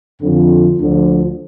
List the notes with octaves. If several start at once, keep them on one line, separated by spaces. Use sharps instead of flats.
F2 D3 F3
D2 D3 F3